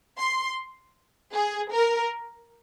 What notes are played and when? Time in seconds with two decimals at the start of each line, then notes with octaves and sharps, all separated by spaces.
0.18 C6
1.34 G#4
1.73 A#4